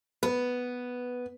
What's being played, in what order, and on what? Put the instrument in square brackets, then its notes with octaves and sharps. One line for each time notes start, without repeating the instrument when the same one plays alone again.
[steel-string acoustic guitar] B3 [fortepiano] B4